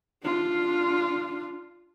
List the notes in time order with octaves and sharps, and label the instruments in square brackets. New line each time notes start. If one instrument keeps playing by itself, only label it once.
[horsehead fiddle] D4 F4